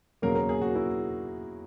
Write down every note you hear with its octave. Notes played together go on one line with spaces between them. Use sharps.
E2 C#3 F#3 A#3 A#4
A#4
G#4
F#4
E4